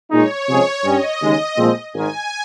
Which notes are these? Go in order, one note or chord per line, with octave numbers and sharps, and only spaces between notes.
A#2 G#3 D#4 C#5
C3 F3 G#3 C#4 G#4
G2 G3 C#4 D#5
D#2 C#3 G#3 D#4 D#5
A#2 F3 G#3 C4
G#1 G#2 D#3 G#5